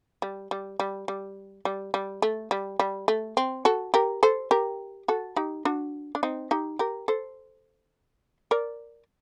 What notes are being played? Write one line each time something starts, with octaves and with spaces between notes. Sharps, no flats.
G3
G3
G3
G3
G3
G3
A3
G3
G3
A3
C4
F#4 A4
G4 A#4
A4 C5
G4 A#4
F#4 A4
D#4 G4
D4 F#4
D4
C4 D#4
D#4 G4
G4 A#4
A4 C5
A#4 D5